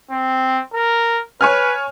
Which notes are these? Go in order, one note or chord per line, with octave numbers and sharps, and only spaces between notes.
C4
A#4
B4 C#5 G#5 F6